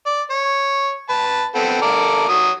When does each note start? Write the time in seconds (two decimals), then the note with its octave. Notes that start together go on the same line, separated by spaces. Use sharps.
0.06 D5
0.30 C#5
1.10 B4 A5
1.55 B3 C4 A4
1.82 A4 A#4 D5
2.29 F#3 D#6